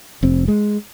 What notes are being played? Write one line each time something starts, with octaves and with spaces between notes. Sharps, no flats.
F1 C4
G#3